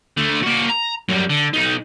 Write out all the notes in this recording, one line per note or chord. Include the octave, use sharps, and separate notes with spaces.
D3 A3
A#3 F#4
A#5
F#2 G3
D3
B1 D#4